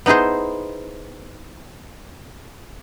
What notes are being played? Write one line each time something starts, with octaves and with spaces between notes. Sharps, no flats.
B3 D#4 E4 G#4 C5